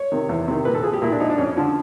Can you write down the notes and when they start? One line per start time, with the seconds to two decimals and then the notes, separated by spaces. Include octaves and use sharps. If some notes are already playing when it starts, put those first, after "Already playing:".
Already playing: C#5
0.12 C3 D#3
0.29 E2
0.48 C3 D#3
0.65 A#2 B4
0.75 A4
0.83 F3 G#4
0.93 G4
1.02 A#2 E4
1.12 D4
1.20 F3 D#4
1.30 D4
1.38 F2 C#4
1.57 D3 F3